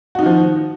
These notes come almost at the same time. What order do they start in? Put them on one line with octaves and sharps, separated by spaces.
F#4 D#4 D#3 F3